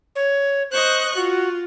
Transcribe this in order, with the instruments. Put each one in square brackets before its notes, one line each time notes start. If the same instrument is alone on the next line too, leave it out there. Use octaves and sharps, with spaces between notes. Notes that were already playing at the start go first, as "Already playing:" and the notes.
[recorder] C#5
[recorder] C5 [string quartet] D#5 C#6 F#6
[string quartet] F4 [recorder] F#4